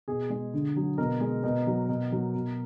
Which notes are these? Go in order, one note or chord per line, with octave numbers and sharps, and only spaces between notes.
B2 G#4
G#3
D3
F#3
B2 A#4
G#3
B2
F#3
B2
F#3
B2